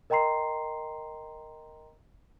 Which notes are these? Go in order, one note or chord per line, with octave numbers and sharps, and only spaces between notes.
A#4 D#5 G5 A#5 C6 C7